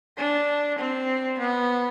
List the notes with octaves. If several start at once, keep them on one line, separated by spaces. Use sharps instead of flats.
D4
C4
B3